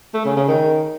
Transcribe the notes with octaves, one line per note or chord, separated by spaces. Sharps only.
A3
C#3
C#3
D#3